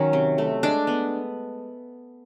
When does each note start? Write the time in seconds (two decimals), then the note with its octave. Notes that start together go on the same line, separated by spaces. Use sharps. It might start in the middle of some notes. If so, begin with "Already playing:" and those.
Already playing: D#3 F#3 C#4
0.13 C3
0.38 A3
0.63 G#3 D4
0.87 B3